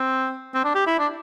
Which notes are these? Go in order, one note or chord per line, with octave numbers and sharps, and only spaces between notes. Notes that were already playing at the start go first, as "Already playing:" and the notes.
Already playing: C4
C4
D4
G4
E4
D4